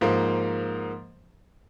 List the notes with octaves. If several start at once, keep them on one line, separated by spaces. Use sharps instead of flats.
G#2 F3 A#3